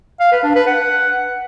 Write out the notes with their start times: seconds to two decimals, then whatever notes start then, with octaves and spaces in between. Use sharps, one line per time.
0.20 F5
0.32 B4
0.44 D4
0.55 B4
0.67 F#5